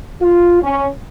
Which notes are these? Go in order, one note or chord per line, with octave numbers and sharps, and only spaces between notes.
F4
C#4